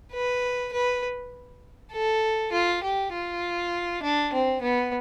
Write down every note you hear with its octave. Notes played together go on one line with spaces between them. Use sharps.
B4
B4
A4
F4
G4
F4
D4
C4
B3